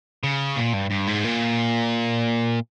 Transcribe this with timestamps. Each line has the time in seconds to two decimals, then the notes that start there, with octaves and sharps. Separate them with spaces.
0.23 C#3
0.56 A#2
0.73 G2
0.91 G2
1.08 G#2
1.25 A#2